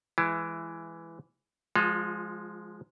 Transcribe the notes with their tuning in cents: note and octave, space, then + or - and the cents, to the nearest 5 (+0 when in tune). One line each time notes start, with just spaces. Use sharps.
E3 +10 G#3 +0 E4 +20
F3 +0 G#3 +0 F4 +40